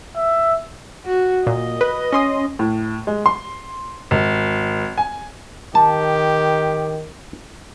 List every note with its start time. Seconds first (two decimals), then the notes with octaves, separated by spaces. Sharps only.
0.17 E5
1.05 F#4
1.47 A#2 D#5
1.81 B4
2.13 C#4 C6 D#6
2.59 A2
3.07 G#3
3.26 C6
4.11 G#1
4.98 G#5
5.75 D#3 G4 A5